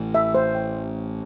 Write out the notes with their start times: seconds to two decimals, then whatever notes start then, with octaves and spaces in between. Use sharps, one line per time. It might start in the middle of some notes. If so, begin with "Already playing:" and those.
Already playing: A1 A2
0.15 E5
0.35 C5
0.55 G5